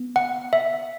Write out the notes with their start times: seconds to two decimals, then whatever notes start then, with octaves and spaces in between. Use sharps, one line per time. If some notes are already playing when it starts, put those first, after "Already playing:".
Already playing: B3
0.16 F#5
0.53 E5